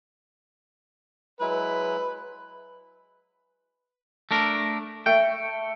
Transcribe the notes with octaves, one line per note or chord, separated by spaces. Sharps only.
F#3 G#3 E4 B4
A3 D4 A#4
A3 G5